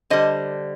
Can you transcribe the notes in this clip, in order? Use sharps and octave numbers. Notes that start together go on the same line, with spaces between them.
D3 G3 C5 D#5